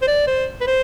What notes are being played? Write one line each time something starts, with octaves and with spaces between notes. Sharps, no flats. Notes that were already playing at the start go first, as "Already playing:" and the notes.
C5
D5
C5
B4
C5